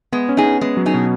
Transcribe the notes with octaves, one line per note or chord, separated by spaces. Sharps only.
G#3 B3
C#4
D#4 G#4
B3
G#3 B3
F#3
D#4 G#4
B2